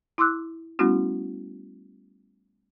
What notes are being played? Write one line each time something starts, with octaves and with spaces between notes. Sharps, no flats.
E4 C6 D6 E6 F#6
G3 A3 B3 C#4 E4 F#4